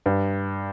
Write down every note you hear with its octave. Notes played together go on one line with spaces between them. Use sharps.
G2